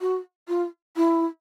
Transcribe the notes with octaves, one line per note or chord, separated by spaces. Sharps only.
F#4
F4
E4